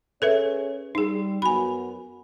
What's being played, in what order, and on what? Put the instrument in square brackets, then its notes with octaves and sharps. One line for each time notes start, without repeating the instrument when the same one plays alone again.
[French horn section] C#4 G#4 C#5 [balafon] A4 B4 E5
[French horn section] G3 [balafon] D#4 G#4
[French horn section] F#2 B3 F#4 [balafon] G#5 B5